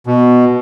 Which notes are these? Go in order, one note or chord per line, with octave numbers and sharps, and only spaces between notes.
B2